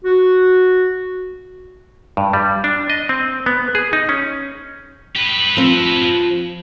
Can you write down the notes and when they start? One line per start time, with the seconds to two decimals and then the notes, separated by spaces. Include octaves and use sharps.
0.05 F#4
2.17 G2
2.33 G3
2.64 D4
2.90 D#5
3.09 C4
3.46 B3
3.75 G#4
3.93 D#4
4.09 C#4
5.16 G4 B4
5.57 F3 C4